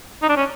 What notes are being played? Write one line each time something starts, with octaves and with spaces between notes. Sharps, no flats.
D#4
D4
C#4